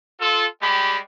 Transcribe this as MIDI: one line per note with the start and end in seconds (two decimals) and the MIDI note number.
0.21 0.46 65
0.21 0.46 69
0.63 0.99 55
0.63 0.99 56
0.63 0.99 67
0.63 0.99 83